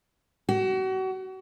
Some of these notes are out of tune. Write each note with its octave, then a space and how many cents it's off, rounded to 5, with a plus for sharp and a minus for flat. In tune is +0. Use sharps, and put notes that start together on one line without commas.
F#4 +35